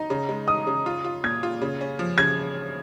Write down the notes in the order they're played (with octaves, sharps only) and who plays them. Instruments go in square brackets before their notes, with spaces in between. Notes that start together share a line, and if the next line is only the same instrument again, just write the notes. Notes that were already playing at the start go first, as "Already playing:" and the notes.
Already playing: [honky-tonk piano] D#4 [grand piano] A#5
[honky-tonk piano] C#3
G#3
[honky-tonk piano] D#4 [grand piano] D#6
[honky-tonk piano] C#3
F4
F4
[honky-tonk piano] A#2 [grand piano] G#6
[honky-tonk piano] F4
C#3
C#4
F3
[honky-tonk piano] C#3 [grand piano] G#6